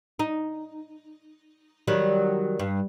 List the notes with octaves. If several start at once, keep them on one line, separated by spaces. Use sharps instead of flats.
D#4
D#3 F#3 G3
G2